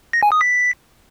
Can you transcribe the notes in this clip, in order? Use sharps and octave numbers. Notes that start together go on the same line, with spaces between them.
A#6
G#5
D#6
B6